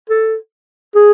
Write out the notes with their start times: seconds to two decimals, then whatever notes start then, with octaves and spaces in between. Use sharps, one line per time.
0.10 A4
0.95 G#4